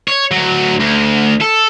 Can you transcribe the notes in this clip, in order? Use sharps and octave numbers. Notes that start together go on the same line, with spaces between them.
C#5
D2 F#3
D2
A4